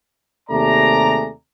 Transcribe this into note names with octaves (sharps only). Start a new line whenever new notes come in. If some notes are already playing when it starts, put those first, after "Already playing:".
D#2 C3 A3 G#4 D5 A#5